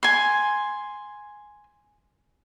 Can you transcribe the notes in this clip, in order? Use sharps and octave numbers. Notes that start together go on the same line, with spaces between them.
G#5 C6